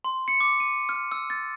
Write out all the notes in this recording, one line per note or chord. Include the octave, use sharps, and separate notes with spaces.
C6
C#7
D6
D#7
F6
E6
A6